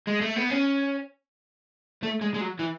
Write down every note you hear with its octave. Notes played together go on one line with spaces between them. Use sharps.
G#3
A3
B3
C#4
A3
G#3
G#3
F#3
E3